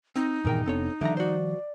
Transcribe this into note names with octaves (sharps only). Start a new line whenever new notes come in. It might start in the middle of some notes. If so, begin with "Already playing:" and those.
C4 D#4
E2 G2 A#2 D#3 A#4 G5
F1 B3 C4 D4 A4 C#5
D3 D#3 F3 G3 E5 A#5
F#4 C5 D5